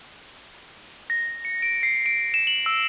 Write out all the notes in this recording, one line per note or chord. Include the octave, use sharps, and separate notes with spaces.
A#6
C#7
D7
C7
D7
E7
F#7
E6